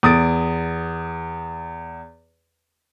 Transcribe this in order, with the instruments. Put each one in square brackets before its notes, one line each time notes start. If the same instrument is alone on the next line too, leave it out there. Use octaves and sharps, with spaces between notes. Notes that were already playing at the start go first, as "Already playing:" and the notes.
[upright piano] E2 D#6 A6 D7